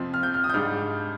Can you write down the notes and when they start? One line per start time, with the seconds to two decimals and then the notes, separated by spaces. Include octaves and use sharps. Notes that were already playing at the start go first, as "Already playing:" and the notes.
Already playing: F2 C3 F3 C4
0.14 F6
0.23 G6
0.34 F6
0.44 D#6
0.50 G6
0.54 G#2 G3 D4 F6